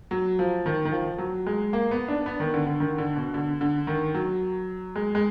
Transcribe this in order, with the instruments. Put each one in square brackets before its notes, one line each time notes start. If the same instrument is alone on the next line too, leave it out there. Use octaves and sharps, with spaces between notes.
[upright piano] F#3
F3
D#3
D#3
F3
F#3
G#3
A#3
B3
D4
B3
D#3
D3
D3
D#3
D3
B2
D3
D3
D#3
F#3
G#3
G#3